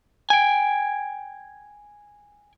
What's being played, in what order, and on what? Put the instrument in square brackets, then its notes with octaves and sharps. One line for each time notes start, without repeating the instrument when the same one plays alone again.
[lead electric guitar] G5 G#5